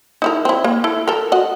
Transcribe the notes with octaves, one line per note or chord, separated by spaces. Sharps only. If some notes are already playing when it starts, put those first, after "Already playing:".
D#4 E4 A#4
C4 E4
A#3
E4 A4
A4 A#4
F#4 D#5